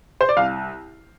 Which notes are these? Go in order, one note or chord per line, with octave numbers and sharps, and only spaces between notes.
C5
D5
C2 F5